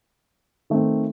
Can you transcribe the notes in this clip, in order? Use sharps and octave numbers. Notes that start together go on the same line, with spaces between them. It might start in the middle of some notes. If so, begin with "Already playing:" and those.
D#3 A3 C4